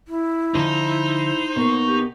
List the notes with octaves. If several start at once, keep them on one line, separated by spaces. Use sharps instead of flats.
E4
D3 F3 D#4 C5 A#5
B2 A#3 B3 C#6
G4